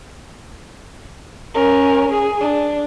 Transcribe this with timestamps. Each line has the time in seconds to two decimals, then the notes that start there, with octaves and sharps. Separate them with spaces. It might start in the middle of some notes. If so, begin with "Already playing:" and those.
1.54 C#4 A#4
2.11 G#4
2.41 D4